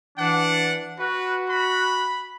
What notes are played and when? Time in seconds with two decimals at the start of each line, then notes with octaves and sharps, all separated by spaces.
0.18 E3 D4 F#5
0.99 F#4 B4
1.50 B5